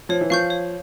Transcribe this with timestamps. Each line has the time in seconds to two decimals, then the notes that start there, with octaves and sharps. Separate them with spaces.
0.09 F3 C#5
0.21 E3
0.30 F3 F5 C#6 G6
0.50 C#5